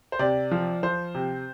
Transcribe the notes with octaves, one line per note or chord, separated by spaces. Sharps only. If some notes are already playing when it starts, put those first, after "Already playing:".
C5
C3 D5
F3
F3 C5
C3